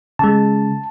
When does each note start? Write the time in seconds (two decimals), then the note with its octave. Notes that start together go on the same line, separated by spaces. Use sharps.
0.19 C#3 G#3 A5